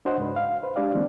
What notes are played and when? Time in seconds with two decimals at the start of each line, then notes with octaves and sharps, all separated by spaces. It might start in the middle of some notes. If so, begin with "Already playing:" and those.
0.05 D4 F#4 C5 C#5 D#5 F#5
0.18 C#2 G#2 B4
0.36 F5
0.63 B4 C5
0.76 G#3 D4 G4 D5 F5
0.94 D3 E3 G#3 A#3 C4